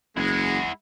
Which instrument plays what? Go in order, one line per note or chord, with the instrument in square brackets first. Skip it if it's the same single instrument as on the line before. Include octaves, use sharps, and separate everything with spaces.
[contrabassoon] F#1 [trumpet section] G#3 [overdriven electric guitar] E4 F#5